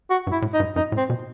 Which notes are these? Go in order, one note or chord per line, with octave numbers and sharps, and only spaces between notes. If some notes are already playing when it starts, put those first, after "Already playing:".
F#4
G2
E4
A2
D#4
G2
F#2 D#4
A2
C4
B2